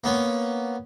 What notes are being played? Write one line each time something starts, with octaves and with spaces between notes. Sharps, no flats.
A#3 B3 C#4